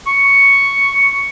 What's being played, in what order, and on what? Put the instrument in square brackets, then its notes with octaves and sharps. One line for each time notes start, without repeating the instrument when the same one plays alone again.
[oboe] C#6